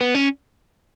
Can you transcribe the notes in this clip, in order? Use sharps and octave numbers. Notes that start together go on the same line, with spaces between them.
B3
C#4